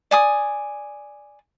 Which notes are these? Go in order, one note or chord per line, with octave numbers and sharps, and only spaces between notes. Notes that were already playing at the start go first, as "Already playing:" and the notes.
D5 G#5 D#6